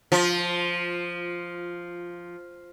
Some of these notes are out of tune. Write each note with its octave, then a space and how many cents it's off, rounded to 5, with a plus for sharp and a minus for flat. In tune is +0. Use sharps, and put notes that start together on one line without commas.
F3 +0 F4 +15